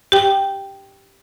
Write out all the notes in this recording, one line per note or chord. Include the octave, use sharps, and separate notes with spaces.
G4 G5